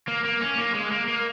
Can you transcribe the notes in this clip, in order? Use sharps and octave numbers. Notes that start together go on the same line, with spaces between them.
A#3
A#3
C#4
A#3
G#3
A#3
A#3